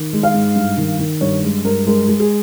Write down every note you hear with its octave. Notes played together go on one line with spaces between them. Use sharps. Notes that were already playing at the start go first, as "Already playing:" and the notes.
Already playing: D#3
G#3
F5
G#2
G2
D#3
D#3
G2 C#5
G#3
G2 A#4
G#3 A#4
G#3
G#4